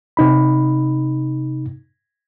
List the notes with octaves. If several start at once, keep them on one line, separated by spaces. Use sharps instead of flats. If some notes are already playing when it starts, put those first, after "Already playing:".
C3 D#4 B5